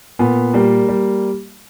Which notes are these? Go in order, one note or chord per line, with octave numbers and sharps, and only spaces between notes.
A#2 B3
G3 A#3
G3